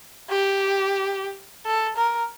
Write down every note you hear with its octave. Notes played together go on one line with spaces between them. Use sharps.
G4
A4
A#4